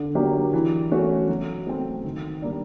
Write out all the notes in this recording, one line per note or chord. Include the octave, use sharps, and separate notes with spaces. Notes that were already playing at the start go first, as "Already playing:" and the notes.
Already playing: D3
F#3 A#3 D4 G4
E3
A3 C#4 F#4
F#3
A3 C4
D#3
G3 A#3 D4